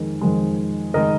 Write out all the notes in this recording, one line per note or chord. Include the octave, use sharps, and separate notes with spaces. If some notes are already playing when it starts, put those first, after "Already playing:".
Already playing: F2 D#3 G#3
F2 D#3 G#3
D#3 G#3 A#4 D#5